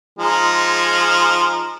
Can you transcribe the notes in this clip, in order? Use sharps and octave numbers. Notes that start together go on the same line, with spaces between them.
F3 G#3 D#4